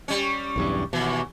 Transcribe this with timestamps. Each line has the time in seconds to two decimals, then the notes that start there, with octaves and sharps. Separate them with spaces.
0.08 G3 C#4
0.56 B1 E2 G2
0.93 D#2 B2 E3